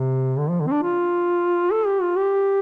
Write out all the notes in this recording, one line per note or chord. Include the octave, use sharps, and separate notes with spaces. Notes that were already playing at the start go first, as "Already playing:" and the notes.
Already playing: C3
D3
F3
D3
C4
D4
F4
A4
G4
F4
G4